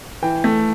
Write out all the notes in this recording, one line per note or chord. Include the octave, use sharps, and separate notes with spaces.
E3 G5
A3